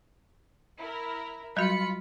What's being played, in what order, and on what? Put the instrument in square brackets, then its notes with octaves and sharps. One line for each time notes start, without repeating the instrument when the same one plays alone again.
[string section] E4 A#4
[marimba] F#3 G3 F#4 [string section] F4 B5 C#7